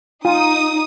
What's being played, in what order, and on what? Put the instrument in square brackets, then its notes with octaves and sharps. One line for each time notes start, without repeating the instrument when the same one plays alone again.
[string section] D#4 [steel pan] F4 [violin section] D#6